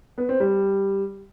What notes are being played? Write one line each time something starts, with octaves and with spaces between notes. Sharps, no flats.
B3
C4
G3